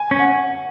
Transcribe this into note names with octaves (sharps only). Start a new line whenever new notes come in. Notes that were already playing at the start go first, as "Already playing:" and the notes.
Already playing: G#5
C#4
F#5